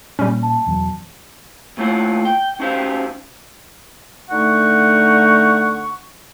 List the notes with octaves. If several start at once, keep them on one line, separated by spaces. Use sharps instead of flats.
A#2 G3 C#4
A5
E1 E2 F#3
D#2 A3 E4 F4 C#5 F#5
G5
C#4 D#4 F#4 G4 C5 F5
D3 A3 D#4 F#5 C#6